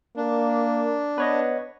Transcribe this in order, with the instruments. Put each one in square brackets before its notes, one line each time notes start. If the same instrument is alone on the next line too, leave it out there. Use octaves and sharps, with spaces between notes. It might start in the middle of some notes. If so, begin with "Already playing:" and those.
[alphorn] A#3 [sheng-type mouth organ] D4
[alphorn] B3 [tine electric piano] B4 C#5 D#5